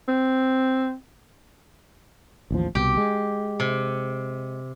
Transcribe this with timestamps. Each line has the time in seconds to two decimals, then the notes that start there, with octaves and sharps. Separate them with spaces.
0.08 C4
2.51 A1 D#2 F3
2.75 C2 B2 G4
2.97 G#3
3.60 C3